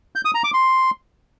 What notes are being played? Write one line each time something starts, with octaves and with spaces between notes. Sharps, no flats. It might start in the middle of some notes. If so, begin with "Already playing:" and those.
G6
D#6
A#5
D6
C6